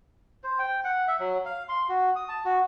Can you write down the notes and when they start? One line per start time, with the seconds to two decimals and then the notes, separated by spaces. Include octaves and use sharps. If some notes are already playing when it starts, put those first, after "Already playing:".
0.44 C5
0.59 G5
0.84 F#5
1.08 E5
1.20 F#3
1.45 F5
1.69 C6
1.89 F#4
2.16 D#6
2.29 A5
2.45 F#4